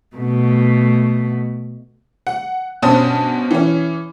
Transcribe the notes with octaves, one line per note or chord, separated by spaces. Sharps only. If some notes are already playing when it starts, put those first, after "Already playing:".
B2 A3
F#5
G2 B2 C#4 C5 A5 D#6
E3 C#4